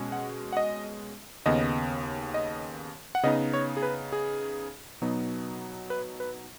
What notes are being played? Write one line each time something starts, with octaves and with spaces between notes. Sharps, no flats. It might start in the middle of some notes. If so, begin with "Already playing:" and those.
Already playing: B2 G#3 C#4
F#5
F#5
D#5
D#2 C#3 B3 D#5
D#5
F#5
C#3 B3 D#4 D#5
C#5
G#4
B4
G#4
B2 F#3 B3 D#4
B4
B4